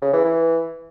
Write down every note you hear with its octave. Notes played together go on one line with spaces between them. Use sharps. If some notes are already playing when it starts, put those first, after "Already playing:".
C#3
E3
E3